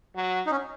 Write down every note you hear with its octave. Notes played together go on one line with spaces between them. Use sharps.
F#3
D#4
C#4